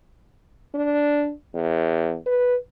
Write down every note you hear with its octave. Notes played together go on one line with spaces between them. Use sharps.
D4
E2
B4